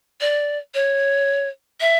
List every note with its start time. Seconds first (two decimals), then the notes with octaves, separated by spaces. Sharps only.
0.21 D5
0.74 C#5
1.80 E5